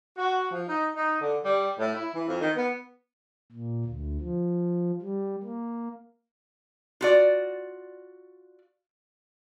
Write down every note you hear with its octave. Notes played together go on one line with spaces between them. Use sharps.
F#4
F3
D#4
D#4
D3
G3
A2
E4
E3
F2
D#3
B3
A#2
D2
F3
G3
A#3
F4 F#4 D5